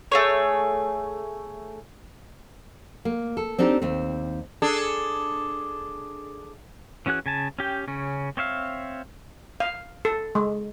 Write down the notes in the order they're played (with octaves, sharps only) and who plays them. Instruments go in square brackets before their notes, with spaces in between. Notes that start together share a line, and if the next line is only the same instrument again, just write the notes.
[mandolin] A3 G#4 C#5
[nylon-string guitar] A#3
A4
C4 D4 D#4 G4
D#2 C4
[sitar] D4 G#4 A4
[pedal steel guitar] E3 C#4 F#4 G#4 F#6
C#3 G#5 A5
C#4 G4 G5
C#3 C#4
C4 C#5 E5 F5
[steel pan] F5
A4
G#3